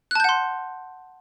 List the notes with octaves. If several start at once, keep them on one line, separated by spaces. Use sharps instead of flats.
F#5 A5 C6 F#6 G6